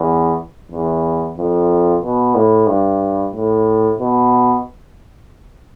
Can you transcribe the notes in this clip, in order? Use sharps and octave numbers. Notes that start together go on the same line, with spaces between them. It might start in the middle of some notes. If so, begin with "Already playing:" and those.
Already playing: E2
E2
F2
B2
A2
G2
A2
B2